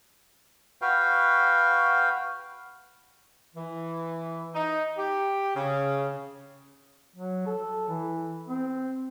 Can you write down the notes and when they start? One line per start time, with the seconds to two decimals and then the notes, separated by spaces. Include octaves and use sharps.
0.82 F#4 B4 F5 G5
3.55 E3
4.54 D#4
4.97 G4
5.54 C#3
7.16 F#3
7.46 A4
7.89 E3
8.49 C4